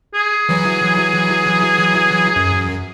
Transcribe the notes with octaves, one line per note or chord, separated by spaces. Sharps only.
G#4
E3 F#3
F#2